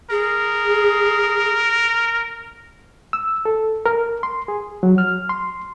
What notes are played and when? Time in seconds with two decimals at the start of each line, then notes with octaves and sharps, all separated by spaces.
0.11 G#4 A#4
3.13 E6
3.45 A4
3.86 A#4
4.23 C6
4.48 G#4
4.83 F#3
4.98 F6
5.29 C6